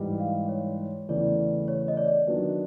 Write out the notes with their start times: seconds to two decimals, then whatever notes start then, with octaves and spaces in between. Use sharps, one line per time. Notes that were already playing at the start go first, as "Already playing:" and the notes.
Already playing: G#2 E3 G3
0.20 F5
0.49 C#5
1.08 E2 C#3 E3 A3 D5
1.68 C#5
1.88 D#5
1.97 D5
2.27 D#3 F#3 B3 D4